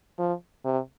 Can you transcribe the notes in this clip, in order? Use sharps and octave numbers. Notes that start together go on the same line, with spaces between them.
F3
C3